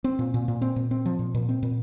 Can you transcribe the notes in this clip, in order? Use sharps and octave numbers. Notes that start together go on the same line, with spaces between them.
C4
A#2
A#2
A#2
C4
A#2
C4
F3
A#2
A#2
C4
A#2